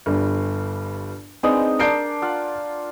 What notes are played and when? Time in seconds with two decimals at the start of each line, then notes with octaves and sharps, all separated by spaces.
0.06 G1 G2
1.43 G#3 B3 C4 D4 D#4 D#6
1.79 D4 A#4 G6 C7 D7
2.22 F4 F5 F#5